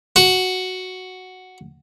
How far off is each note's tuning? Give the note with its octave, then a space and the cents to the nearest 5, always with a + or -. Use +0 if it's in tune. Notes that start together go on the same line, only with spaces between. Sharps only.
F#4 +0